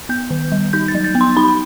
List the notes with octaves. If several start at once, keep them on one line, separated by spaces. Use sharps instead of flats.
B3 G6
D#3
G3
D#4 G6
A6
F#3
A6
B3
C6
D#4 B5